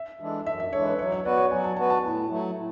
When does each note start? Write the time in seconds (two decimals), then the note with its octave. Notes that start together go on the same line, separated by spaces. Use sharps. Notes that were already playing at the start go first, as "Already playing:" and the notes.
Already playing: E5
0.20 E3 G#3 D4 A4
0.45 F#2 E5
0.60 E5
0.73 E3 G#3 D4 A4 C#5
0.86 B4
0.99 F#3 C#5
1.12 C#5
1.25 B3 F#4 B4 D5
1.37 C#5
1.51 F#3 G#5
1.64 A5
1.77 B3 F#4 B4 A5
1.90 A5
2.04 A2
2.30 F#3 A3
2.55 A2